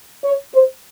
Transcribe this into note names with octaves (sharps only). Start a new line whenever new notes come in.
C#5
C5